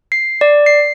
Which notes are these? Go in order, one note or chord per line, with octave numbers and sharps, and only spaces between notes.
C7
D5
C7